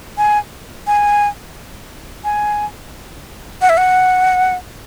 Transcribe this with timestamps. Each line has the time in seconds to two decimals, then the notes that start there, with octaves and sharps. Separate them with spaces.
0.18 G#5
0.87 G#5
2.24 G#5
3.62 F#5
3.69 E5
3.77 F#5